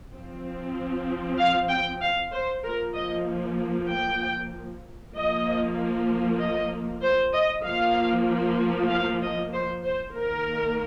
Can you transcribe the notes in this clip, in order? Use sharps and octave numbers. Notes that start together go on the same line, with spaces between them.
F3 C4
F5
G5
F5
C5
F3 A#3 A#4
D#5
G5
F3 A#3 D#5
D#5
C5
D#5
F3 A#3 F5
F5
D#5
C5
C5
D#3 A#3 A#4